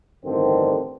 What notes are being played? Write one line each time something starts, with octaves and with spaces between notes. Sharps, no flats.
A1 G2 D3 D#3 C4